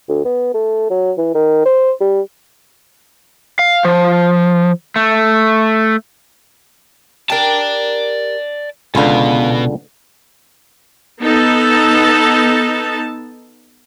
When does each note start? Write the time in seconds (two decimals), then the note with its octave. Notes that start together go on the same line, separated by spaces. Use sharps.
0.09 D2
0.25 B3
0.54 A3
0.90 F#3
1.18 E3
1.35 D#3
1.65 C5
2.00 G3
3.59 F5
3.85 F3
4.96 A3
7.30 G4 A#4 D5 A5
8.95 C#2 B2 D3 B3 G#4 F5
11.22 B3 D#4 A4 A5